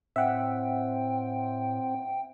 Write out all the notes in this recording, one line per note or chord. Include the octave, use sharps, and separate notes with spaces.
A2 C4 E5 F#5 G5